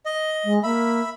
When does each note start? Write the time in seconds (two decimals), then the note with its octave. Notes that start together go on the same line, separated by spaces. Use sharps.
0.06 D#5
0.44 G#3
0.63 A#3 E5 B5